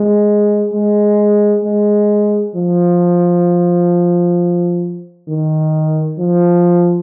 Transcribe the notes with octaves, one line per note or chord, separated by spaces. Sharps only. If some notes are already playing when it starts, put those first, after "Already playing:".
Already playing: G#3
G#3
G#3
F3
D#3
F3